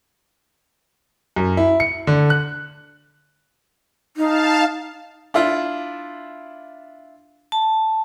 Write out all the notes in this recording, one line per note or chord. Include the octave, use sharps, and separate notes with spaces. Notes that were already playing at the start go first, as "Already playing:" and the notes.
F#2
E4
C#7
D3
F#6
D#4 F5 A5
D4 E4 F4
A5